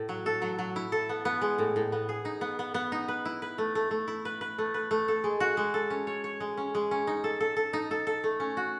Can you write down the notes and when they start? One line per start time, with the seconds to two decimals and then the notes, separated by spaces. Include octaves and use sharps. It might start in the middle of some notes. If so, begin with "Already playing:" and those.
Already playing: A2
0.09 F#3
0.26 A4
0.42 F#3
0.59 F#3
0.76 E4
0.92 A4
1.09 B3
1.25 B3
1.41 G#3
1.58 A2
1.76 A2
1.92 B3
2.09 G#4
2.25 D#4
2.41 B3
2.59 B3
2.74 B3
2.92 D#4
3.08 B4
3.25 E4
3.42 B4
3.58 A3
3.75 A3
3.91 A3
4.08 E4
4.25 B4
4.41 B4
4.58 A3
4.74 B4
4.91 A3
5.08 A4
5.24 G#3
5.40 F#4
5.57 G#3
5.74 A4
5.90 C#4
6.07 C#5
6.24 C#5
6.40 G#3
6.57 C#4
6.75 G#3
6.91 C#4
7.07 D#4
7.24 A4
7.40 A4
7.57 A4
7.73 D#4
7.91 A4
8.07 A4
8.24 A3
8.40 C#4
8.57 F#4